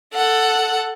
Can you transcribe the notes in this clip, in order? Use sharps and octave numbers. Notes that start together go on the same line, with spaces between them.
A4 F#5